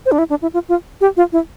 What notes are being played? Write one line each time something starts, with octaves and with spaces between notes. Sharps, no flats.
C5
D4
E4
D4
E4
F4
F4
G4
F4
E4